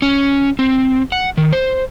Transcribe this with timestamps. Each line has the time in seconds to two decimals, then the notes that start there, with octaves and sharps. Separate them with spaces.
0.02 C#4
0.59 C4
1.12 F#5
1.37 D#3
1.53 C5